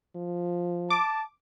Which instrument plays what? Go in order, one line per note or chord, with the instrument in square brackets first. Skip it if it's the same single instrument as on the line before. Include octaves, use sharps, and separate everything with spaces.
[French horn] F3
[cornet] A5 [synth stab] D6